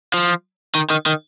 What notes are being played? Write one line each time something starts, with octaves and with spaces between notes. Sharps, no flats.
F3
D#3
D#3
D#3